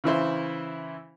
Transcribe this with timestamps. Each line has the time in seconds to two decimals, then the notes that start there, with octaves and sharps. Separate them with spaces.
0.04 C#3 E3 E4 C5